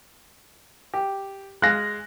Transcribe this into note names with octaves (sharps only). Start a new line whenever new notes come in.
G4
G#3 F5 F#6 A#6